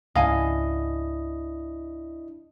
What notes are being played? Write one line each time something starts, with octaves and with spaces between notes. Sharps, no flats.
C#2 G#2 C#3 D4 E4 D#5 F5 G#5